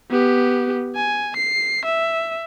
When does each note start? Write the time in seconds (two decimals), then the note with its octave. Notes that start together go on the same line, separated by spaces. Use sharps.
0.10 B3 G4
0.96 G#5
1.37 C7
1.85 E5